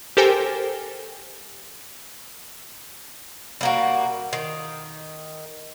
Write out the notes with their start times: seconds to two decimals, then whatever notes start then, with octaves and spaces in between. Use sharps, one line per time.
0.17 G4 A4 A#4 C5 G5 G#5
3.61 G3 A#3 F#4
4.33 D#3